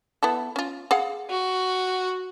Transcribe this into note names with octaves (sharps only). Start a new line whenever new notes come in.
B3 E4 A4
C#4 F4
G#4 F5 F#5
F#4